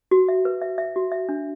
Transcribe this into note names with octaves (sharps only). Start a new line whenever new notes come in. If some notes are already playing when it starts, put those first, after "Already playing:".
F#4
E5
B4
E5
E5
F#4
E5
D4